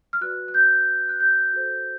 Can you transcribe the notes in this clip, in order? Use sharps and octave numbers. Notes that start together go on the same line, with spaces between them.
F6
F#4 B4 D5 F#6
F#6
G6
F#6
G6
F#4 A4 C5